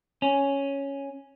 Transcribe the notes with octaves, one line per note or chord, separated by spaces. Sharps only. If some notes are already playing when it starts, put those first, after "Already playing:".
C#4